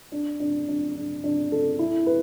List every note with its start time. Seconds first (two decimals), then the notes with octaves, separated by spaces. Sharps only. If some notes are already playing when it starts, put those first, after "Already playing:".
0.12 D4
0.40 D4
0.68 D4
0.95 D4
1.24 D4
1.52 A4
1.79 E4
2.07 B4